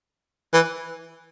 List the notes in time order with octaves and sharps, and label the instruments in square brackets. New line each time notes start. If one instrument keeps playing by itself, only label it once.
[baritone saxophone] E3